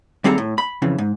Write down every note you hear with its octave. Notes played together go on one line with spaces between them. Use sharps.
D#2 G3 C4 G#4 A4 A#5
A2
B5
F2 C#3 E3
G#2